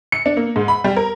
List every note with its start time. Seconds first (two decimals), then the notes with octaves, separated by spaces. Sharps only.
0.12 C#7
0.26 D4
0.37 A#3
0.56 G#2
0.68 B5
0.84 G3
0.96 A#4